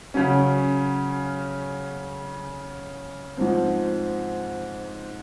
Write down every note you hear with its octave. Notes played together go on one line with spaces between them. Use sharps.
C#3 F#3 C#4
G#2 F3 C4